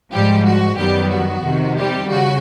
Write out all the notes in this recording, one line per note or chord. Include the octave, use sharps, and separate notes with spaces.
G#2 F3 G3 G#3 G4
F#4
F#2 D#3 F#3 G3 B3 G4
F#4
F2 C3 D#3
G3 G4
C#3 F#4